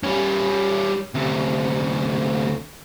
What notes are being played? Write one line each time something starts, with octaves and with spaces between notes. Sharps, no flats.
G3 C#4
D2 C3